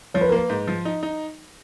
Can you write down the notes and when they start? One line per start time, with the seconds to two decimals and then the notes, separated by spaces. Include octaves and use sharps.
0.14 F3 C#5
0.21 B4
0.29 A#4
0.32 A#3 B4
0.49 G#2
0.68 F3
0.85 D#4
1.03 D#4